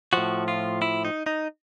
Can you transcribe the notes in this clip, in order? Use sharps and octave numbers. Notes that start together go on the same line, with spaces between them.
A2 F3 F#4
F4
E4
D#4
D#4